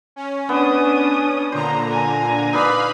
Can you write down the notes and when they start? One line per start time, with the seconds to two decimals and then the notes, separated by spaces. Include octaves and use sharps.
0.16 C#4
0.49 B3 D4 D#6
1.52 A#2 D3 C5 A#5
1.91 G#5
2.53 D#4 B4 D5 F5 B5